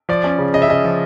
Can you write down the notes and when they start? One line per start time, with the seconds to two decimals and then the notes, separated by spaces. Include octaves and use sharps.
0.09 F3 D5
0.24 C#4
0.39 C#3
0.54 C#3 D#5
0.62 E5
0.69 C#3 D#5
0.84 F3